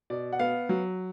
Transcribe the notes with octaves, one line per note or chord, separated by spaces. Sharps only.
B2 D5
F#5
B3 F5
F#3